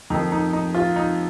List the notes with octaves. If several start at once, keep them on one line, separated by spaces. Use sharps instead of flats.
F2 D#3 D#4
D#4
D#4
F4
D#4